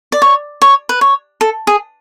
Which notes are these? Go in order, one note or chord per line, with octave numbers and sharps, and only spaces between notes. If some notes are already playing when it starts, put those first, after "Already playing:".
D5
C#5
C#5
B4
C#5
A4
G#4